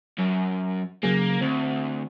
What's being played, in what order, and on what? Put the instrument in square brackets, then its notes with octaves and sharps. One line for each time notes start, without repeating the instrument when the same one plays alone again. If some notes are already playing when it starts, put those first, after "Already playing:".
[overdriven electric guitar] F#2
[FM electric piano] C#3 F#3 G#4 [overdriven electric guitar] A#3
[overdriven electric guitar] D2 [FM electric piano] C4